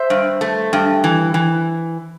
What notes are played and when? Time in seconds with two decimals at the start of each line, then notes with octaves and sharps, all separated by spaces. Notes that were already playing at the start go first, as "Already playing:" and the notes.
Already playing: C5 E5
0.10 G2
0.41 A3
0.73 G2
1.04 E3
1.34 E3